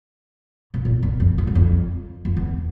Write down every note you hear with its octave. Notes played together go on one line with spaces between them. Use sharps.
C3
A#2
C3
F2
E2
G2
F2
F2
E2